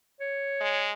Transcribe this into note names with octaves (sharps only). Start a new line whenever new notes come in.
C#5
G#3